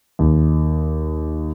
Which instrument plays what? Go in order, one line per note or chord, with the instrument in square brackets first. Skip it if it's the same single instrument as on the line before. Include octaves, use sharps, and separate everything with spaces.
[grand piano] D#2